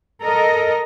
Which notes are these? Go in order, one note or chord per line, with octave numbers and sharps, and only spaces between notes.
A4 A#4 D#5